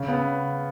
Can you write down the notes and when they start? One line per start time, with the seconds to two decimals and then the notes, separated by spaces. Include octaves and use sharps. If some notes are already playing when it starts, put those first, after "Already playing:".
Already playing: C#3
0.08 B3